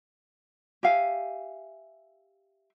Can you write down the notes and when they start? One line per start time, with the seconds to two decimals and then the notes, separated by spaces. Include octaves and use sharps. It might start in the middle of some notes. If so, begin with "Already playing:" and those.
0.83 G4 E5 F5 G#5